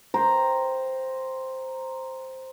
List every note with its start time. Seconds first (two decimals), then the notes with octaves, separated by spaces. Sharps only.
0.14 C5 G5 A#5